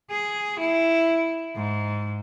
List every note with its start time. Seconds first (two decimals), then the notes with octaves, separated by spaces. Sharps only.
0.10 G#4
0.60 E4
1.56 G#2